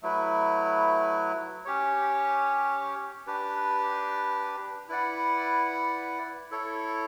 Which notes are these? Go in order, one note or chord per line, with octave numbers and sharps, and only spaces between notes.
F#3 A3 E4 B4
C#4 G4 C#5
D4 G4 B4
E4 B4 D5 F#5
E4 A4 C#5